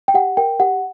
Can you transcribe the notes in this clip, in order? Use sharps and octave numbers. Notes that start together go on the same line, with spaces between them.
G5
G4 F#5
A#4 G5
G4 F#5